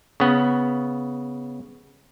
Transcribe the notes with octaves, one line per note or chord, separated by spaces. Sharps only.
C#3 B3